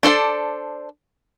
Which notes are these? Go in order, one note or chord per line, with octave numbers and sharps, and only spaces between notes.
D4 A4 C5 D5